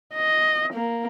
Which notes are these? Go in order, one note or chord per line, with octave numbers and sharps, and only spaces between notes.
D#5
A#3